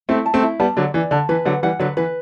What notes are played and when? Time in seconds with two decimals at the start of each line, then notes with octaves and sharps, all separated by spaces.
0.09 A3 C4 E4
0.26 A5
0.34 A3 C4
0.43 E4
0.60 G3 B3 A5
0.77 D3 F#3 D5
0.94 E3 D5
1.11 D3 A5
1.29 E3 B4
1.45 D3 F#3 F#5
1.63 E3 G3 F#5
1.79 D3 F#3 B4
1.97 E3 B4